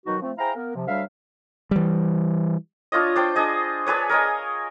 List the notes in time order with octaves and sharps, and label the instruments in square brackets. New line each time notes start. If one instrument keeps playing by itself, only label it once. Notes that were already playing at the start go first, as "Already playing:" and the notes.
[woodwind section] B2 D#3 F#3 D#4 F#4
F3 A3 C4
E4 G#4 C5 F5 G5 A#5
A#3 B3 A#4
C3 F3
D2 F#3 G3 D4 E5 F5
[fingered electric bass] E3 G3
[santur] D4 F4 C#5 D#5
D4 C5 G5
D4 G#4 D#5
D4 G#4 B4 C#5
A#4 C#5 D#5 G#5